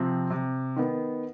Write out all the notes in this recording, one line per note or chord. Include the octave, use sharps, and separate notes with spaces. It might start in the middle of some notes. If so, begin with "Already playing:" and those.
Already playing: C3 F3 C4
C3
D#3 B3